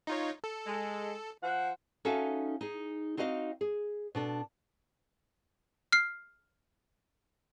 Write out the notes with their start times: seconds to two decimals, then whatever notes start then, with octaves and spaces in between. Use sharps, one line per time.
0.07 D#4 F4 C#5
0.44 A4
0.67 G#3
1.43 F3 F#5
2.05 C#4 D#4 F#4 A4 E5 F5
2.61 D#4 G#4
3.17 C4 D#4 F#4 D#5 F5
3.61 G#4
4.15 B2 D4 A4
5.92 F6 C7